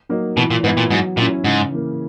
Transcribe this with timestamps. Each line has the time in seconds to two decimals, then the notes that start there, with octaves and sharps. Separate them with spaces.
0.09 F#3 A#3 D#4
0.37 B2 E3
0.51 A#2
0.64 G#2 B3
0.67 E4
0.77 A#2
0.90 G#2 F#3
1.17 A#2 C#4 E4
1.44 G#2 C#3
1.71 E3 A#3